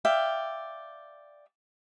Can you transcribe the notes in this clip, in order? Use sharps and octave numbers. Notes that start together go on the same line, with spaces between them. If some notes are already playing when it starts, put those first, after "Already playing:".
D5 E5 F5 G5